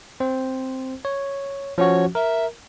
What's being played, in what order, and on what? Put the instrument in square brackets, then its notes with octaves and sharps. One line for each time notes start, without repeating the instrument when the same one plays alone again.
[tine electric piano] C4 C5
C#5
[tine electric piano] F3 C#4 F#4 [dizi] C#5
[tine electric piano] A#4 [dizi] E5